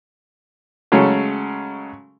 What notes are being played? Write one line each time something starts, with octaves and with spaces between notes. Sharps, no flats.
C#3 F#3 G#3 A3